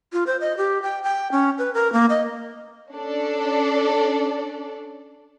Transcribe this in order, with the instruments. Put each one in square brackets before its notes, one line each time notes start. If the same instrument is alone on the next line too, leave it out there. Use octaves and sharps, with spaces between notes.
[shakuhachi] F4
C5
D#5
G4
G5
G5
C#4
B4
A#4
A#3
D#5
[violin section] C#4 D4 A4 D5